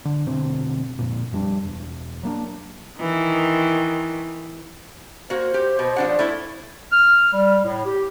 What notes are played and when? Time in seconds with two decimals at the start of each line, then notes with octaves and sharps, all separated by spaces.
0.05 D3
0.26 F1 B2 D3 C4
0.99 F2 A#2
1.32 F2 G3 D4
1.65 E1
2.23 F#3 A#3 D4
3.00 D#3 E3
5.30 A#3 F#4 C5
5.54 G4
5.79 B2
5.96 F3 D4 F#5
6.19 A3 E4
6.92 F6
7.33 G3
7.64 A2
7.85 G4